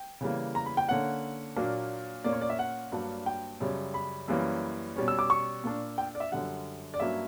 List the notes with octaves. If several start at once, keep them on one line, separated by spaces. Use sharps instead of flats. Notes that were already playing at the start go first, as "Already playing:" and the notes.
Already playing: G5
C#3 E3 G3 A#3
A#5
B5
G5
D3 A#3 C#4 F#5
A#2 F#3 A#3 D4
A#2 A#3 C#4 D5
C#5
D5
E5
F#5
G2 F#3 A#3 D4
G5
F#2 C#3 G3 C#4
B5
F#2 E3 G3 A#3 C#4
B2 G3 C#4
E6
D6
C#6
A#2 A#3 D4
G5
D5
E5
F#2 D3 G3 F#5
D5
G2 F#3 A#3 C#4 E5